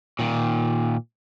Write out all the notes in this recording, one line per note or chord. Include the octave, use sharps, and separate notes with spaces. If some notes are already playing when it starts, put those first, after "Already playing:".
A#2 D#3